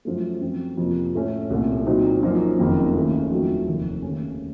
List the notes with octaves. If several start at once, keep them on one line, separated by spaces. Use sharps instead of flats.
F#2 F3 A3
F#2 F3 C4
F2 C3 F3 A#3
A2 A3 C#4
C2 A#2 A3
A#2 F#3 C4 D#4
F#2 F3 A#3 D#4
F#1 F2 D#3 A#3
D#2 C#3 A3
F2 D#3 F#3 A3
F1 D#2 D#3
D#2 C#3 A3 C#4